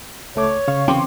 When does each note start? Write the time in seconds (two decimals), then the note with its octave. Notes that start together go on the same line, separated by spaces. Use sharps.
0.36 C#2 A3 C#5 D6
0.68 C#3 F5 C#6
0.88 E3 C4 C#4 G5 C6 D6